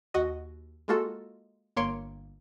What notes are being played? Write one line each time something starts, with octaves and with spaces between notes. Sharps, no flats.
D#2 F#4 D#5
G#3 A#3 F4 F#4 A4
G1 A#3 C#5 C6 C#6 D7